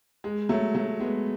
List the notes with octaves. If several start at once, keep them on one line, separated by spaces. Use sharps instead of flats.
G#3
F#3 A3
F#3 A3
G#3 B3